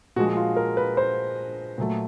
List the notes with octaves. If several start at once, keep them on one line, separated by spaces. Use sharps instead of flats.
A#2 F3 G#3 F#4
F4
A#4
B4
C5
A#2 F#3 A3